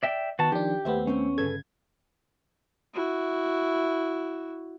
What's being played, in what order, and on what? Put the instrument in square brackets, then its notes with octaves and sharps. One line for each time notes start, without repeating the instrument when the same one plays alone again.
[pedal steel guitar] D5 E5 G5
[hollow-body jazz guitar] D#3 [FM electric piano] B3 [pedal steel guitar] F#4 A5
[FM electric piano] D#3 D4 [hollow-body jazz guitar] F3 [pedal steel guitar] G4
[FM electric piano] D#2 B3 [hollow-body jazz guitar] A3 C5 E5
[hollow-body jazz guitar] A3 C4 C5 [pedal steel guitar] C#4
[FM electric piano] G1 C#3 G#6 [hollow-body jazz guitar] A4 B4
[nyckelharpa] E4 F#4